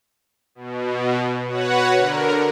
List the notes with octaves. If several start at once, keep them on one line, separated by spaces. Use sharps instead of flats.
B2
F#4 B4 C#5 F#5
D3 A#4